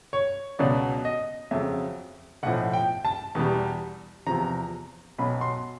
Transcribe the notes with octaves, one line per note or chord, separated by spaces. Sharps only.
C#5
C#2 B2 F#3 D5
D#5
F2 C#3 F#3 E5
B1 A2 F3 F#5
G5
A5
E2 B2 G3
E2 C3 F3 A#5
B1 B2 F#3 B5
C6